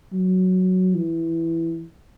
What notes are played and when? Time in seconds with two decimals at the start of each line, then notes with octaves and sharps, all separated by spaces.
0.12 F#3
0.94 E3